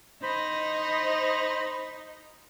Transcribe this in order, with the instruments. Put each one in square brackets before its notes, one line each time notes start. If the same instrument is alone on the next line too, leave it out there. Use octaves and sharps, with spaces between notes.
[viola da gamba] D#4 [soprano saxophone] C5 [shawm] D#5 [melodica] B5